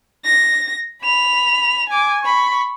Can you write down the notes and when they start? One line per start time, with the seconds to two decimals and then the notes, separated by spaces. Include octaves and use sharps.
0.25 A#6
1.02 B5 F7
1.89 G#5 D6
2.23 B5 C#6